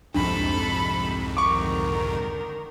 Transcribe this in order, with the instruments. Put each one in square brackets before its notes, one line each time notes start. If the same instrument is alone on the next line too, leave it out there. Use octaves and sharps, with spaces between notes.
[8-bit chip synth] C2 F2 G#2 [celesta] D4 [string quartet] A4 B5
[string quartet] D3 D#3 A#4 [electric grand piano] C#6 D6